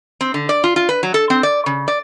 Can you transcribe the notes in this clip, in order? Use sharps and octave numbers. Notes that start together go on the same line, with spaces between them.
C4
D3
D5
F4
F4
B4
F#3
A4
C4
D5
C#3
D5